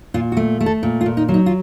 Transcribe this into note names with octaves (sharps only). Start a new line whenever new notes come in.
A#2 F4
F#4
A3
A3
A4
A#2
F4
A#2
D#4
F#3
D#4
F4